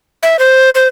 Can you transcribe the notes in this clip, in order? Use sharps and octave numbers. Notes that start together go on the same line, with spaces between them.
E5
C5
C5